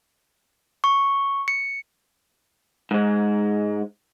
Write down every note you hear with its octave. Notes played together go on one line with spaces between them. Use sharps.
C#6
C#7
G#2 G#3